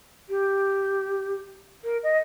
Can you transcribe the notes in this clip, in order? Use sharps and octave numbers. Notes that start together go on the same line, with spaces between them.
G4
A#4
D#5